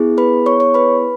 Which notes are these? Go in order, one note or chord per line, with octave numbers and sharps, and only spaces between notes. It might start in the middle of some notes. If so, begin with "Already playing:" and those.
Already playing: B3 E4 G#4
B4 B5
C#5 C#6
C#5 C#6
B4 B5